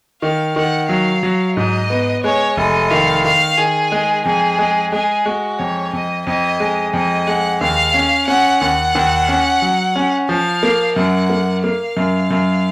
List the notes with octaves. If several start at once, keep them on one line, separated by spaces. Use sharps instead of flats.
D#3 F5
D#3 F#5
F#3 F5
F#3
G#2 D#5
B3
G#3 C#5
F1 D#5
D#3 F5
D#3 F5
D#3 G#4
G#3
F2 G#4
G#3
G#3 G#4
G#3 F#4
F2 C#5
F2 D#5
F2 D#5
G#3
F2 D#5
G#3 F#5
D#2 F5
C#4
C#4 F#5
D#2 F#5
D#2
C#4
F#3
C#4
F3 F5
A#3
F#2 F#5
A#3
A#3 F5
F#2
F#2